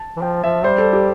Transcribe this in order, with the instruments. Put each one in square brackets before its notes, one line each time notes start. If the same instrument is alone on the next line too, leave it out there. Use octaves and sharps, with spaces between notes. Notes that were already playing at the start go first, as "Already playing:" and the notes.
Already playing: [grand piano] A5
[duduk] E3
[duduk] F3 [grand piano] G5
[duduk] F3 [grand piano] E5
[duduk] G3 [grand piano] C5
[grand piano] A4
G4